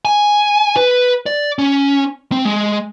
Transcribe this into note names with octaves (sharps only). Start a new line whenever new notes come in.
G#5
B4
D5
C#4
C4
G#3